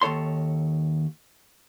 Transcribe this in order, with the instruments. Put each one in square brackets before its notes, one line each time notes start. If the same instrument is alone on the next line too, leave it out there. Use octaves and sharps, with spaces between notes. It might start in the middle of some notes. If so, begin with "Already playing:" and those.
[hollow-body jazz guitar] D#2 A4 C#5 C6